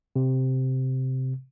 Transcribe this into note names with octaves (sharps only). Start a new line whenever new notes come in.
C3